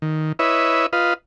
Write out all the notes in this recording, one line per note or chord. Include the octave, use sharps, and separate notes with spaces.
D#3
E4 B4 C#5 D#5 E5
F4 B4 D#5 F5